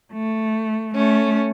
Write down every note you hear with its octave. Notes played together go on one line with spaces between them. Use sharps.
A3
A3 C#4